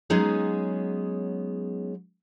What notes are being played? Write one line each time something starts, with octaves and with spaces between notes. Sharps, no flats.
F#3 G#3 B3 C#4 D#4 G#4